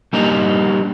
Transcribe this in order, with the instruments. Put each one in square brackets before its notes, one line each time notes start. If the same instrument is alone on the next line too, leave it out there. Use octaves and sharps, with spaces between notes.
[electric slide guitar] G3 A#3 D4 D#4 G4 A#5